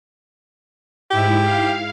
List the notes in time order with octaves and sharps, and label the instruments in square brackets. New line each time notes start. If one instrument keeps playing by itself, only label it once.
[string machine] G#2 E4 [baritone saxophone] G4
[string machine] F5